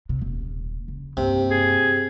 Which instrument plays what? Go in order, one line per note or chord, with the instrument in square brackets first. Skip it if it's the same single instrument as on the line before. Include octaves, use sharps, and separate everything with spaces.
[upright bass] C3
D#1
C#3
[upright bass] G2 A#3 [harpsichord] C3
[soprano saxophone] G#4